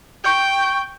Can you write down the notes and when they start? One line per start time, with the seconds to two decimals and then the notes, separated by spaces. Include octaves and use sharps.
0.24 G5 C#6 G6